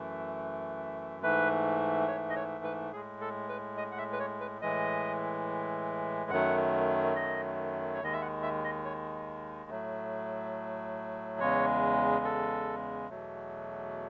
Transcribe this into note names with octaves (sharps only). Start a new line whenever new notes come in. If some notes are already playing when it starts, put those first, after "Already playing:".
Already playing: F#2 E3 A3
G#2 E3 A3 B4
C#5
D#5
C#5
B4
A2 G#3 G#4
A4
B4
D#5
F#5
E5
B4
C#5
B4
A2 E3 G#3 D#5
F#2 D#3 F#3 A3 F#5
D#5
C#5
D#2 D#3 G#3 D#5
E5
F#5
E5
D#5
C#5
A2 F#3 A3
E2 C#3 G#3 C#5
A4
E2 B2 F#3 A3